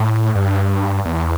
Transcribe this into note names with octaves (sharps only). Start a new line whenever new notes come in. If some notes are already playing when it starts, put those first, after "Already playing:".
Already playing: A2
G2
E2